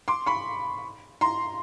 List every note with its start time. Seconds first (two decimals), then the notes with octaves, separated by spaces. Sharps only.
0.08 C6 D6
0.26 B5 C#6
1.21 A#5 C6